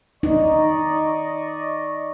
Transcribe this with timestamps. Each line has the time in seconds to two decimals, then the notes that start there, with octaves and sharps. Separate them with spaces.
0.23 D#4 D5 D#5 C#6